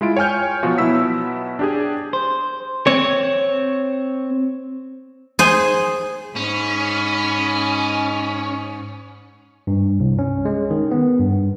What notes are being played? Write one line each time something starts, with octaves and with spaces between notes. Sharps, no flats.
G#3 E4 F4 D7
C#5 G5 G#5 F6 G6
B2 F3 F#3 F4 F#4
B2 F#3 B3 E4 E6 B6
D4 G4 G#4
C5
C4 C#5
G#4 C5
G#2 C#4 D#5 B5
G2
C2
C#4
G#3
D#3
B3
G2